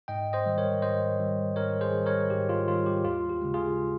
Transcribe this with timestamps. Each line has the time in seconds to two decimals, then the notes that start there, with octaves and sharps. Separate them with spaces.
0.08 G#2 D#5 G5
0.33 C5 D#5
0.46 D#3 G3
0.58 A#4 C#5
0.82 G#2 C5 D#5
1.20 D#3 G3
1.56 G#2 A#4 C#5
1.81 G#4 C5
1.93 D#3
1.98 G3
2.06 A#4 C#5
2.30 G#2 G4
2.49 F4
2.68 D#3 G3 F4
2.86 G4
3.04 D#2 F4
3.29 G4
3.42 C#3 G#3
3.54 F4 G#4